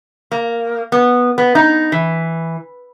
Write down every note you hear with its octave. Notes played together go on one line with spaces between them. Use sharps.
A#3
B3
B3
D#4
E3